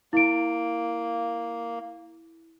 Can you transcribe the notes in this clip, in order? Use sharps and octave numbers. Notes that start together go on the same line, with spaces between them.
A#3 E4 D7